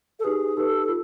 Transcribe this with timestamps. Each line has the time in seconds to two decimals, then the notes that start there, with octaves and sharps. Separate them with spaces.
0.19 A4
0.23 D#4 G4 G#4 B4
0.57 D#4 G4 A4 B4
0.88 F4